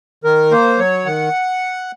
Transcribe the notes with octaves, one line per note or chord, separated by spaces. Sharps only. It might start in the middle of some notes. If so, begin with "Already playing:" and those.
D#3 A#4
A#3 C5
F#3 C#5
D#3 F#5